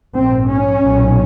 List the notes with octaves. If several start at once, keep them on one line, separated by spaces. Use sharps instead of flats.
A#1 G#2 C4
C#4
B1 A#2